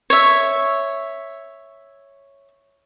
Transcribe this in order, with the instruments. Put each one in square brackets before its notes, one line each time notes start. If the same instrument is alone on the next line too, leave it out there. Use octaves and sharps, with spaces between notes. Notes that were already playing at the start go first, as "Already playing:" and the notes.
[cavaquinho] C#5 E5